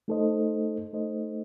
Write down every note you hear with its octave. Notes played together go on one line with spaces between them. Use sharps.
A3 D#4 A4 C5 D#5
A3 D#4 A4 C5 D#5